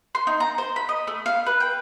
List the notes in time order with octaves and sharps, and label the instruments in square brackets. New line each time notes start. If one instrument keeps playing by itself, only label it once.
[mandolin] C6
D#4
A#5
C5
B5
D#5
A3
F5
B4
G5